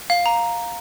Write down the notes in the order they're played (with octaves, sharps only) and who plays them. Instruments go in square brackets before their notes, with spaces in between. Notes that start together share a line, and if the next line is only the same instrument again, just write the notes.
[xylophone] F5
A#5